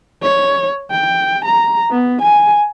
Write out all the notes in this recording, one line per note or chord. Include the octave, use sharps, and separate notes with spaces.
C#5
G5
A#5
B3
G#5